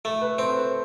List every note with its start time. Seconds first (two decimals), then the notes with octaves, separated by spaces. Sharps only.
0.05 A3 A4
0.21 B4
0.38 C4 C5
0.50 C5
0.56 B4